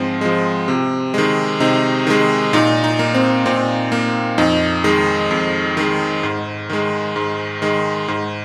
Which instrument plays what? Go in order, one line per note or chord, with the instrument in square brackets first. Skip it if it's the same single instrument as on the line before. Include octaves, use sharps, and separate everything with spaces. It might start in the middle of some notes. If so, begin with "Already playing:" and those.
Already playing: [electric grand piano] G#2 F3 G#3 C4
F3 G#3
C3
D#3 G#3
C3 D#4
D#3 G#3
A#2 D#4
D#4
A#3
C4
A#2 C4
A#3
F2 D#4
D#3 G#3
F2
D#3 G#3
G#2
D#3 G#3
G#2
D#3 G#3
G#2